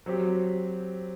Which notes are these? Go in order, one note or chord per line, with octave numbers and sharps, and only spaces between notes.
F#3 C4 G4